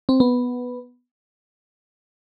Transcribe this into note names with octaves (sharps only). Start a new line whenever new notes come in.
C4
B3